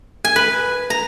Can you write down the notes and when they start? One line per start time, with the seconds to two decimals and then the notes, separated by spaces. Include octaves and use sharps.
0.25 G#5
0.36 B4
0.90 A#5